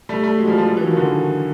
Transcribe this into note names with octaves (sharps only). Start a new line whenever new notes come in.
G3 A3
G3 A3
F#3 G#3
F3 G3
F3 G3
F3 G3
E3 F#3
D#3 F3
D3 E3
D#3